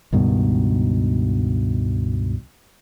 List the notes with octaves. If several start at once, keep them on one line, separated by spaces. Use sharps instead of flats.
C#2 G2 B2 D#3